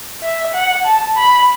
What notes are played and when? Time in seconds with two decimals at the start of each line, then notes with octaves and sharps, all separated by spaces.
0.23 E5
0.54 F#5
0.86 A5
1.17 B5